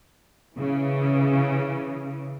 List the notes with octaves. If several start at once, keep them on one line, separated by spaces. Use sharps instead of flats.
C#3 E3